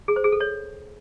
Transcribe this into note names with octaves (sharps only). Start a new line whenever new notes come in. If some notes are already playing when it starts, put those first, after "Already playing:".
G#4
C5
G#4
A4
C#5